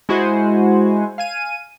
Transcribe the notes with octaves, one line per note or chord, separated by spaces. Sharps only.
G#3 E4 F#4 C5 F#5 G#5
F5 G#5 D#7